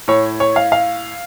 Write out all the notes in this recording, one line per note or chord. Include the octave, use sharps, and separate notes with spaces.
A2 C#5
C#5
F5
F5